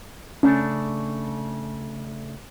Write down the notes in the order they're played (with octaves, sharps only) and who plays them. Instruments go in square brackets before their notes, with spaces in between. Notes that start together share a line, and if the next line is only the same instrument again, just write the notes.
[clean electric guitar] C#3 A3 D4 [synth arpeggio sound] C#4